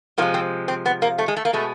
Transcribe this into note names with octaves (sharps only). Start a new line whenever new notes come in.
C3 F3 G#3 A#3
C4
C4
B3
A#3
A3
G#3
A3
A#3
B2 G#3 A3